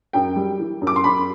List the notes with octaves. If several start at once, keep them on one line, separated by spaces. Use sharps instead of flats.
F#2 G5
G3
E3
F#2
D6
C6
F#2 B5